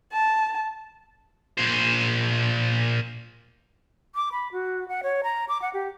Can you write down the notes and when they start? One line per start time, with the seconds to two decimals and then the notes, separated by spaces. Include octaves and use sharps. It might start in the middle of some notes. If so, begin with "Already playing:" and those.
0.12 A5
1.58 A#2 C5
4.15 D6
4.32 B5
4.52 F#4
4.88 F#5
5.03 C#5
5.23 A#5
5.49 D6
5.62 F#5
5.74 G4